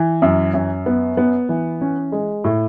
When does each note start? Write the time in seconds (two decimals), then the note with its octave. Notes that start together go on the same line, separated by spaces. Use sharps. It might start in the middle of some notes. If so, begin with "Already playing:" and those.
Already playing: E3
0.22 F#2
0.54 F#2
0.86 B3
1.17 B3
1.49 E3
1.81 C#4
2.12 G#3
2.44 A2